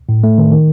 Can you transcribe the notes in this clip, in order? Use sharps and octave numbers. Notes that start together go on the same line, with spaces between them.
A2
A3
D#3
D#3